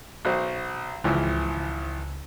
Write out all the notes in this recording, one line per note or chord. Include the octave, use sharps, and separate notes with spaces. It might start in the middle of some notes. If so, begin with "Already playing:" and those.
B1 F#4 C5
G#1 C#2 E3 F3